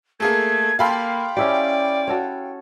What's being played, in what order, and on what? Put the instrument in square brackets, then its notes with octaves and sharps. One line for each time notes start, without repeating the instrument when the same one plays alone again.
[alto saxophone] A3 [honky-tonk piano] A#3 G#4 A4 [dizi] G#6
[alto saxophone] A#3 [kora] G4 A4 [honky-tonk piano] F5 B5 C6 [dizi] G5
[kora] C#4 E4 G4 [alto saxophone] D5
[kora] F#4 A4 C#5